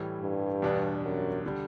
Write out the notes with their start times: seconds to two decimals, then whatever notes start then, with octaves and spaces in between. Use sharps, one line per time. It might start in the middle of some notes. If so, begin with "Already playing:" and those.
Already playing: A2 E3 G3
0.21 G2
0.62 E2 B2 G3 D4
1.03 F#2
1.46 D3 G3